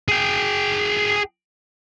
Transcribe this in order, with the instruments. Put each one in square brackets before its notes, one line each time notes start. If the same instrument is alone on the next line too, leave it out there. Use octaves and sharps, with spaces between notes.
[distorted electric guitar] G#4 G5